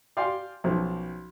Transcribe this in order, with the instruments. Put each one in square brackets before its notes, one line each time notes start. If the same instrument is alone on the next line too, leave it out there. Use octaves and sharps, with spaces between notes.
[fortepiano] D5 F5 G5 G#5 C6
B1 F3 C#4